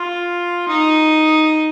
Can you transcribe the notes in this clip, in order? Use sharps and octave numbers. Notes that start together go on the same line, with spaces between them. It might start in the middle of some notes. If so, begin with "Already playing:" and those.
Already playing: F4
D#4